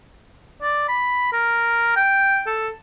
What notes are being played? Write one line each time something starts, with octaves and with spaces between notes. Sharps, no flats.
D5
B5
A#4
G5
A4